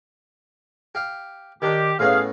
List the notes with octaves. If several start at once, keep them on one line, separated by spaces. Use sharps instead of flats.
G4 F5
D#3 D4 G4
A2 B3 C#4 G#4 F5